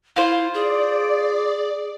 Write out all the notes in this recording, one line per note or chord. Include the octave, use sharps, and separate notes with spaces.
E4 F4 C5
G#4 D5